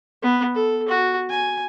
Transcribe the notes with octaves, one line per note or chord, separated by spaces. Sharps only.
B3
A4
F#4
G#5